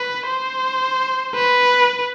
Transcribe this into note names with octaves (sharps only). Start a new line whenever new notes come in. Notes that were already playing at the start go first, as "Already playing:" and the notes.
Already playing: B4
C5
B4